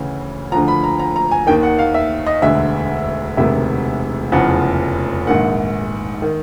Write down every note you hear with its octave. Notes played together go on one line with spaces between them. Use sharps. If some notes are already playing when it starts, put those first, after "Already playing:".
Already playing: D2 C#3 E3
D2 D3 F3 A#5
B5
A#5
A#5
A#5
G#5
D#2 D#3 G5
F#5
F5
E5
D#5
E1 D2 D3 E5
E1 D2 C3 D#3 E5
F1 E2 C#3 F3 F#5
A#1 G#2 D#3 F#5
D#3